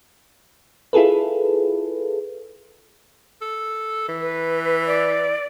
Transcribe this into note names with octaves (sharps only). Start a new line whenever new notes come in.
E4 F4 G#4 A4 B4
A4
E3
B4
D5